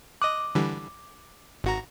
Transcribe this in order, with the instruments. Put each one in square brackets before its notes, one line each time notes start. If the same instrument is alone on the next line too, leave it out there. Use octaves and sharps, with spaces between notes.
[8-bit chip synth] D#5 D#6 F#6 [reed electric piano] D6
[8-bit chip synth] D3 E3 G3
G#1 F#4 A#5